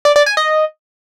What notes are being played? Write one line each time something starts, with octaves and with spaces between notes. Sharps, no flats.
D5
D5
G#5
D#5